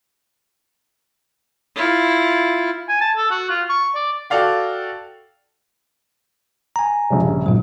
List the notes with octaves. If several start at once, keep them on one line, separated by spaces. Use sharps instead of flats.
E4 F4
G#5
A5
A4
F#4
F4
C#6
D5
F#4 A4 D5 F5 G5
G#5 A#5
A#1 G2 C#3
G#1 A#2 F#3